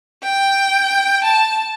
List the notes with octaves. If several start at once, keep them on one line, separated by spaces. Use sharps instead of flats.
G5
A5